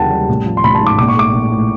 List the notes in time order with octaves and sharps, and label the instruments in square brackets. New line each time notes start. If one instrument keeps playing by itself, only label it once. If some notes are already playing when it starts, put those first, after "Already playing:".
Already playing: [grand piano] D#2 C#3 E3 F#3 F#5 G5 A5
G3
A1
F3
C6
A1 B5
A5
G#2
D6
A#1 D6
C#6
A3 D6
A#1
A2